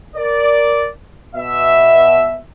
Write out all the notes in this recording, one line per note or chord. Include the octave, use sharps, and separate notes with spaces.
A#4 D5
B2 E5